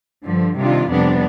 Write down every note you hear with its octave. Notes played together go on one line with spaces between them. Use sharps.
G2 D3 F3
C3 D#3 G3 D4 F4
F2 C3 G3 B3 D4